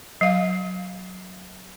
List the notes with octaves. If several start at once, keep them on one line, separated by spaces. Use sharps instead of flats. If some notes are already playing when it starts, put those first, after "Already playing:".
F#3 F5